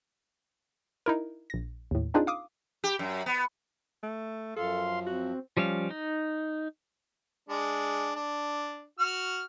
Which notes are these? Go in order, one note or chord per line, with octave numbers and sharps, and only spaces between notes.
D#4 E4 A#4
A#1 A#6
D#2 A2
C4 D4 D#4 F4 G#4
F5 D6 D#6
G4
F#2
B3
A3
F#2 F3 A4 F5 C6
C4 F#4
F3 G3 C#4 F5
D#4
G#3 D4
D4
F#4 F6